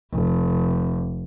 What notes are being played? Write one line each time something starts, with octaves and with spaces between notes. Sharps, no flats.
F1